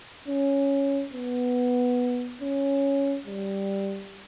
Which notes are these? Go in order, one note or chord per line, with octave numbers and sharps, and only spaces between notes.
C#4
B3
C#4
G3